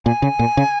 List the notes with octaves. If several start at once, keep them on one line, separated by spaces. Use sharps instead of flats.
A#2 G#5
C#3
A#2
C#3